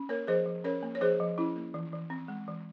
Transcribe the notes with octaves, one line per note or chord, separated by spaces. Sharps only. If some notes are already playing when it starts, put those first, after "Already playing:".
Already playing: C#4
A#3 A#4 C#5
F3 G#4 C5
F3
C#4 A#4 C#5
A#3
C#5
F3 G#4 C5
F3
C#4 E4
A#3
E3
E3
C4
G#3
E3